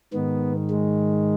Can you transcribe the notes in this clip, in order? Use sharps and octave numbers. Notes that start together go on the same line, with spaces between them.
G#2 D#3 B3
G#3